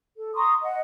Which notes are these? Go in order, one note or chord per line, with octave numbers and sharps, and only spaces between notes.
A4
A#5 C6 C#6 D#6
D#5 F#5